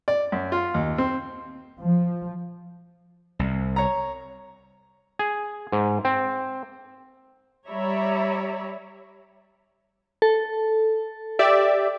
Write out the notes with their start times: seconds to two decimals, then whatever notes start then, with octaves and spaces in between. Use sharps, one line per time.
0.08 D5
0.32 F#2
0.52 F4
0.74 D#2
0.98 C4
1.82 F3
3.39 C2
3.76 C#5 A#5
5.19 G#4
5.72 G#2
6.05 C4
7.69 G3 C#5 D5 E5 A#5 B5
10.22 A4
11.39 G4 D5 E5